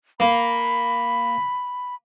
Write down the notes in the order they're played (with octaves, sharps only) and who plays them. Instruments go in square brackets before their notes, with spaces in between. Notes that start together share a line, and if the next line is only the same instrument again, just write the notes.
[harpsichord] A#3 [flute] B5